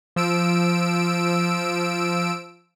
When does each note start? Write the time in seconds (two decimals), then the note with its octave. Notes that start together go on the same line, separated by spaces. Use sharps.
0.16 F3 E6 D7